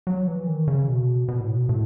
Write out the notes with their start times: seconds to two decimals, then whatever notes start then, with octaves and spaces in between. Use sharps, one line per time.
0.07 F#3
0.28 E3
0.47 D#3
0.68 C#3
0.88 B2
1.28 B2
1.40 A2
1.51 B2
1.69 A2